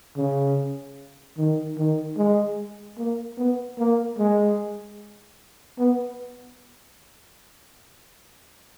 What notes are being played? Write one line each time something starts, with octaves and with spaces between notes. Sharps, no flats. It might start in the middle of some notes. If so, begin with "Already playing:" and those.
C#3
D#3
D#3
G#3
A#3
B3
A#3
G#3
B3